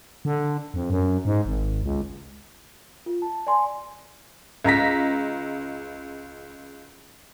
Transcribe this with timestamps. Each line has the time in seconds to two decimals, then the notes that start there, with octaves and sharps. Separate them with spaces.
0.25 D3
0.74 F2
0.90 F#2
1.25 G#2
1.46 G#1
1.83 C#2
3.06 F4
3.22 A5
3.47 D5 G#5 C6
4.65 C#2 A#5 A#6 B6